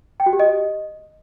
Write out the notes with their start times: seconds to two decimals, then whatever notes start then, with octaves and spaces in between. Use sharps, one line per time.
0.20 G5
0.26 F#4
0.33 G4
0.40 D#5